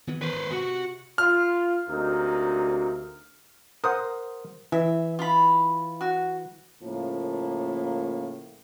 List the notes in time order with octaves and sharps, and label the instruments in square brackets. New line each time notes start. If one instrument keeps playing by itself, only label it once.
[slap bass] D#3 E3 B3
[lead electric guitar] B4 C5
[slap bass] G#1
[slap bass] C3 [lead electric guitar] F#4
[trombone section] F4 [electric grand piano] F6
[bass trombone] D2 [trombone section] C3 A#3 D#4
[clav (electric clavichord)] A#4 C5 F#5 [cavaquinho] D#6
[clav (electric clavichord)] E3 [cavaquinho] E5
[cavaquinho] F4 B5
F#4
[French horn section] A2 C#3 F3 A#3